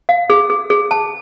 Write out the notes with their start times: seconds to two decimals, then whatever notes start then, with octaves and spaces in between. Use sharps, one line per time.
0.09 F5
0.30 G#4
0.50 G#4
0.70 G#4
0.91 A5